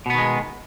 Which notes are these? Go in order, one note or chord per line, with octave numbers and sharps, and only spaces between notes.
B2 D#3 G#3 B3